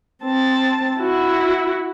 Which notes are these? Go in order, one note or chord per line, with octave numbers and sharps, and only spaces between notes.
C4 A5
E4 F#4